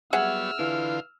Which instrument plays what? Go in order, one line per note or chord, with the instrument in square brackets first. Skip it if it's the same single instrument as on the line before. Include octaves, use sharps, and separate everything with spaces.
[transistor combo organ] F#3 G3 B3 [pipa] G#4 E5 F#5 [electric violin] E6 F6
[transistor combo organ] D3 F4 F5 [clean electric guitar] E3